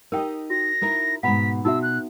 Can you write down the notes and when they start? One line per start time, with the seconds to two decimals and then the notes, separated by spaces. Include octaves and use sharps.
0.12 D#4 G4 A#4 D#5 G5
0.50 F#4 A#6
0.81 D#4 E4 A#4
1.23 G#2 B2 F#5 A#5 B5 B6
1.65 B2 D#4 F#4 E5 E6
1.83 F#6